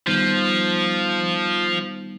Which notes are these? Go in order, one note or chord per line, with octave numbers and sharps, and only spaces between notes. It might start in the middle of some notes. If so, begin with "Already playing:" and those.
D#3 F3 G3 B3 D#4